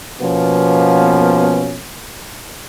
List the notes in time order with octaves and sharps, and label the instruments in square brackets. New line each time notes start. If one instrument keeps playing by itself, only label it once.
[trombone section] B2 F3 A#3 B3 C#4